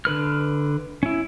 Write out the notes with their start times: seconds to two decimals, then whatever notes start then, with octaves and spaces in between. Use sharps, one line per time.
0.05 D3 B4 F6
1.03 C#4 E4